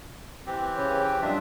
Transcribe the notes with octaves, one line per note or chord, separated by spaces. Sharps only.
E3 C4 G4
C#3 B4 C#5
G5
G2 F#3 D4 F4 D#5 E5